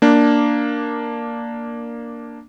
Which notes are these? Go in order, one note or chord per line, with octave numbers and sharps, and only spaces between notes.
A#3 D4